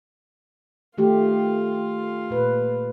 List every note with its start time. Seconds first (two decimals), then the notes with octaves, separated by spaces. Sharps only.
0.98 D#3 A3 F4 G4
2.30 A#2 B4